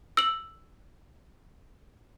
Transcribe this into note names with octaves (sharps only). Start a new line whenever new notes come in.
E6 F#7